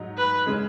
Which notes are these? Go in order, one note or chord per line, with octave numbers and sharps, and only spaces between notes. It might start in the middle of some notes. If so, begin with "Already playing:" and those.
Already playing: G#2 F#3 D#4
B4
C#3 G#3